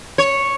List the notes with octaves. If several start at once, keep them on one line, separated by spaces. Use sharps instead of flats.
C#5